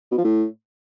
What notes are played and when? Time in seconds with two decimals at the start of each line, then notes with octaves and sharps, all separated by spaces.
0.12 B2
0.18 F3
0.24 A2